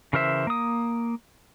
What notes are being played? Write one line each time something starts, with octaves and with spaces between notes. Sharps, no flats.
C#3 E3 A#4 C5 E5
A#3 D#6